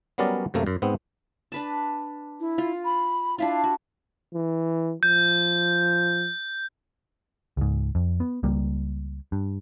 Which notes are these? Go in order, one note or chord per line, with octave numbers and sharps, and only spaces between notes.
F#3 G3 B3 C#4 A#4 D5
F#2 C3 A3 A#3
F#2
G#2 B3 C4
D4 B4 A5
E4
F4
B5
D4 E4 F4 F5
F#4
E3
F3 G6
C#2 G#2
F2
B3
C#2 G3 A#3
G2